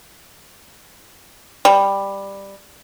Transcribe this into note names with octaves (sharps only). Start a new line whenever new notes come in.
G3